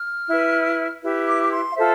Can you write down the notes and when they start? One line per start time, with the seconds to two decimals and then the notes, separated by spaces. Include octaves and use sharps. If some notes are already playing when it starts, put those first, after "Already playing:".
Already playing: F6
0.28 E4 B4
1.02 E4 G4 B4
1.26 D6
1.44 D6
1.51 C6
1.71 F5
1.75 F4 A4 C5 E5